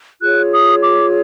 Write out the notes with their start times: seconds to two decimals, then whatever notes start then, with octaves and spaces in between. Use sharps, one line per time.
0.21 F4 G#4 C#5 F#6
0.52 D#6
0.84 D6